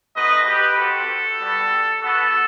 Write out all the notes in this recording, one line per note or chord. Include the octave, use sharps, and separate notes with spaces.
A3 C4 D#4 F#4 B4 D#5
G4 B4
C4 F#4 A4
G3 B3 F#4
B3 F#4 A4